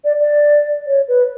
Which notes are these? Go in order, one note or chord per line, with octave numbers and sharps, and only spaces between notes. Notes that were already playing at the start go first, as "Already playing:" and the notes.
D5
D5
C#5
B4